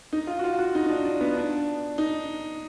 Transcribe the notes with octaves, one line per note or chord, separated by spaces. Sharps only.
D#4
F4
F#4
F4
F#4
D#4
D#4
D4
D4
B3
D4
D#4